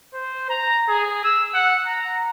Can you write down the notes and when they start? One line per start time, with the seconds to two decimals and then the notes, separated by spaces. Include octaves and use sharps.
0.14 C5
0.50 A#5
0.89 G#4
1.24 E6
1.54 F#5
1.86 A#5